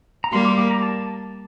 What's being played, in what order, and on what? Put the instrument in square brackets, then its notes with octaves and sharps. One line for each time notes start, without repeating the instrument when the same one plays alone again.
[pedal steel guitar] A#5
[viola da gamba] G3 A#3 [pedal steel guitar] C6
[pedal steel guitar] D6
D6
A#5
A5